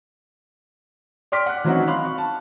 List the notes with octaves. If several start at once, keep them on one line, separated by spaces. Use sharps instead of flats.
D5 G5 C6 D6 F6 B6
F#5 F#6
E3 F#3 C4 C#4 D#4 F#4
F5 B5 C6 F#6
C#6
A5